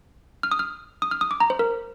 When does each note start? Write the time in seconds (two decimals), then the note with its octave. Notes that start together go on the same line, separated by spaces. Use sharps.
0.43 F6
0.52 D#6
0.59 F6
1.02 D#6
1.11 F6
1.21 D#6
1.31 D6
1.40 A#5
1.50 C5
1.59 A#4